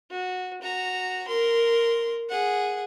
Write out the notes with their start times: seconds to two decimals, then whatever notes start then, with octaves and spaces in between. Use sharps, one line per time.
0.11 F#4
0.62 F#4 A#5
1.28 A#4 C6
2.30 G#4 F#5